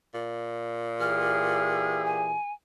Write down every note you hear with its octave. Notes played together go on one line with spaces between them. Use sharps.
A#2
E3 G4 G#4 F6
G#5